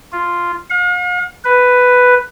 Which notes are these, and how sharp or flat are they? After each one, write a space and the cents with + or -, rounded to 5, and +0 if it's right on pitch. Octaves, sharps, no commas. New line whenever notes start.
F4 -5
F5 +45
B4 +5